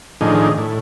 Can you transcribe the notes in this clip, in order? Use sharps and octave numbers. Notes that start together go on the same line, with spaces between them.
A2 D#3 F3 D4 D#4 G#4
A2